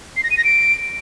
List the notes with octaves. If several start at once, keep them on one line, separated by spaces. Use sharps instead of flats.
C7
A#6
D#7
A#6
D7